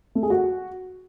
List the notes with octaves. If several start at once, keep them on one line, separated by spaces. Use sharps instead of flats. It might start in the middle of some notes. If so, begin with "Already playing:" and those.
A3
G#4
F#4